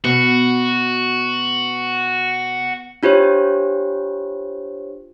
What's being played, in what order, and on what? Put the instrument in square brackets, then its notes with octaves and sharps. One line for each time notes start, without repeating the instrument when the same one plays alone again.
[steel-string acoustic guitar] B2 [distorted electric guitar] F#4
[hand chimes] D4 F4 G4 C5 C#5